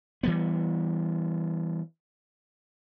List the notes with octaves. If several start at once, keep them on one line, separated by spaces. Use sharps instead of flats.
E3 G3 B3